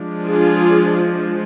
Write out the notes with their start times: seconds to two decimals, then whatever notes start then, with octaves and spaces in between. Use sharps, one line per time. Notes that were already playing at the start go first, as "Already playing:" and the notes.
Already playing: F3 G#3 D4
0.24 F4 G#4